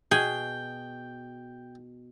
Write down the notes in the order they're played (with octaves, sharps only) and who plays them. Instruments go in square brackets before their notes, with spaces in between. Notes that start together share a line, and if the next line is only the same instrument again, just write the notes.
[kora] B2 [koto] G#4 [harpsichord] G5